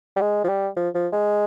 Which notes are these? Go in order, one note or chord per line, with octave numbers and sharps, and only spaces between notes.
G3
G#3
F3
G3
F3
F3
G#3